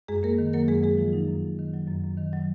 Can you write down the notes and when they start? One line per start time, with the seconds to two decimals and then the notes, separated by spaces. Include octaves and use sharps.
0.08 F#2 G#3 G#4
0.23 F#2 A#3 A#4
0.38 D#3
0.53 F#3 A#3 A#4
0.68 F#2 G#3 G#4
0.83 F#2 G#3 G#4
0.98 D#3 F3 F4
1.13 D#3 F#3 D#4
1.28 F#2
1.42 F#2
1.59 D#3
1.74 F#3
1.88 F#2
2.04 F#2
2.17 D#3
2.33 F#3